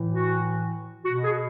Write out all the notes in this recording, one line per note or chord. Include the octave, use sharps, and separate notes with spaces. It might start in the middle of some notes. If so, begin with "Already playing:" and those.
Already playing: A2 E3
F#4
B2 F#4
G#4